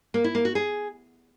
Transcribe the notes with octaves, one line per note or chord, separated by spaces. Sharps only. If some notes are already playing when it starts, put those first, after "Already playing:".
A#3
E4
A#3
F#4
G#4